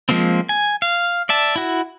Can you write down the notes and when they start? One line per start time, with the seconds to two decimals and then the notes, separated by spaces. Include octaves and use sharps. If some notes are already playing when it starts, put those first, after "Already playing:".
0.09 F3 G#3 A#3 C4
0.49 G#5
0.82 F5
1.29 D5 E5 A5
1.56 E4 F#4